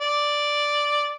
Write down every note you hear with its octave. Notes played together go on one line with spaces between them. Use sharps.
D5